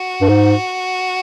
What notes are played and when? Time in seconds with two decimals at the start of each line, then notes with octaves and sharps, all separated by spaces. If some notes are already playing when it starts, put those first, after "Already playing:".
Already playing: F#4
0.21 G2
0.28 G#2